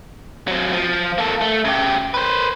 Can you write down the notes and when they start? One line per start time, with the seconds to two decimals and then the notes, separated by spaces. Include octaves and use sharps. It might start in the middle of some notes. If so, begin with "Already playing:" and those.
0.48 F#3 C4
0.73 F3
1.18 A#3 A4
1.41 A3
1.65 C#3 G4
2.14 B4 C5